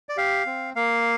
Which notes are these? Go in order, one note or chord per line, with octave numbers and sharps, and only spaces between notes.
D5
G4 F5
C4
A#3 F5